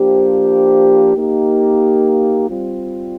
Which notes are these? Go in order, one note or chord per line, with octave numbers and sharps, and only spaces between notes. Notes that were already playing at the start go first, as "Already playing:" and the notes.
Already playing: F3 A#3 D4 G4 C5
A#3 D#4 G4
G3 C4 F4